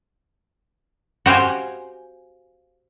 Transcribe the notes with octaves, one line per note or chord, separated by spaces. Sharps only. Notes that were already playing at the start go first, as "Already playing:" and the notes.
F#4 G4 C5 F5 G#5